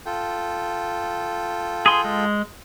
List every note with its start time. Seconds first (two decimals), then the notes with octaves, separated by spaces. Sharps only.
0.06 F4 A4 G5
1.86 G#4 C6
2.04 G#3